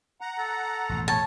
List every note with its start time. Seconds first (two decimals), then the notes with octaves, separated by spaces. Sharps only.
0.21 F#5 A#5
0.39 A4
0.89 A1 F2 B2
1.08 C#5 A5